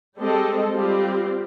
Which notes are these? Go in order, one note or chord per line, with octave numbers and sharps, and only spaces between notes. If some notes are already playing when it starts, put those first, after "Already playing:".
G3 G#3 C4 G4 A4 D#5
G3 C4 F4 G4